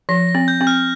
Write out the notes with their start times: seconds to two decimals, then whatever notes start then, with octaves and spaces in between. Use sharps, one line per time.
0.09 F3 A#6
0.29 A#6
0.35 C4
0.48 G6
0.61 C4
0.67 F6